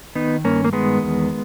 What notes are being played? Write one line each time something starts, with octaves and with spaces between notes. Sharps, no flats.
D#3 B3 D#4
G2 A#3 C#4
A#3
D#3 G#3 B3
E2